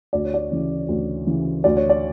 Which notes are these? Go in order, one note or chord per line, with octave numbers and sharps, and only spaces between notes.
D2 D5
C#5
D5
C#3 E3
D2
C#3 E3
D2 D5
C#5
D5